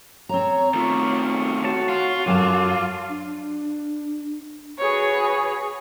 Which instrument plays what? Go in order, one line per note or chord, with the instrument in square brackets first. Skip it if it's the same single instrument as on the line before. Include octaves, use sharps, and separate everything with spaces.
[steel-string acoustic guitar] C4 A#5 [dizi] C#5
[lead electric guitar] D#3 A3 [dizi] F4
[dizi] F#4 [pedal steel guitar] C#5 A5
[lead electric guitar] F4
[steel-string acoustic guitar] F#2 G#5 A5 [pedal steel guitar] F#3 [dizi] D6
[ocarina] D4
[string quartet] F#4 G#4 B4 C#5